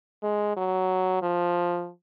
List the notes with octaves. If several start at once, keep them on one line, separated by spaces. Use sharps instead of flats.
G#3
F#3
F3